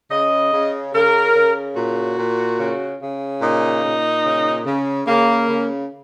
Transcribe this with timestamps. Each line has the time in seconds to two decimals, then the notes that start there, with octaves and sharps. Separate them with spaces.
0.11 C#3 D#5
0.53 C#3
0.94 C#3 A#4
1.36 C#3
1.76 A#2 F#4
2.18 A#2
2.60 C#3
3.01 C#3
3.41 A#2 D#4
3.84 A#2
4.25 C#3
4.66 C#3
5.07 C#3 A#3
5.49 C#3